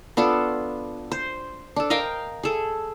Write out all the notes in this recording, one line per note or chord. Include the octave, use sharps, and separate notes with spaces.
B3 D4 F4 A4
C5
D4 A4
A#4 D#5 F5 G5
G#4 A4